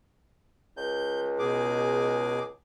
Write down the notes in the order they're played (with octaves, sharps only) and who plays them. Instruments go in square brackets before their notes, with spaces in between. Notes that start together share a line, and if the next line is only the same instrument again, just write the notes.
[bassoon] C#2 [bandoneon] G6
[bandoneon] B2 G#4 D6